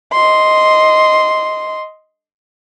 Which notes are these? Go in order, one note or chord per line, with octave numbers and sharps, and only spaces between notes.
D#5 C6